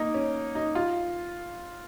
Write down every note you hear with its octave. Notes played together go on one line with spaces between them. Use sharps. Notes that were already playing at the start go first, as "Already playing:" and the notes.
Already playing: A#3 D#4
C#4
D#4
F4